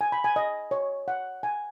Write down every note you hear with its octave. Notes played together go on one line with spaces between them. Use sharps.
G#5
B5
G#5
D#5
C#5
F#5
G#5